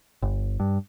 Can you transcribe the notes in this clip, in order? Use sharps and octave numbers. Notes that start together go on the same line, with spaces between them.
G1
G2